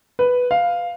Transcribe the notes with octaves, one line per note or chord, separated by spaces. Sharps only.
B4
F5